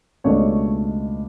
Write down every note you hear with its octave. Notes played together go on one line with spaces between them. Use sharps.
C#2 B2 A3 D4 C#5